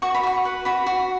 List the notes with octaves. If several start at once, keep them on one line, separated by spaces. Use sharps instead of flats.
F#4 C#6
B5
F#4 C#6
B4
F#4 B5
F#4